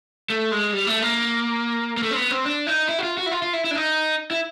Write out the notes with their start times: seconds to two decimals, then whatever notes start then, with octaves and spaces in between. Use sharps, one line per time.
0.30 A3
0.51 G#3
0.73 G3
0.87 A3
1.02 A#3
1.97 A#3
2.03 A3
2.11 C4
2.16 B3
2.31 C4
2.45 D4
2.67 D#4
2.89 E4
2.99 F#4
3.03 F4
3.17 F#4
3.26 E4
3.31 F4
3.42 F4
3.53 E4
3.64 E4
3.71 D4
3.75 D#4
4.31 E4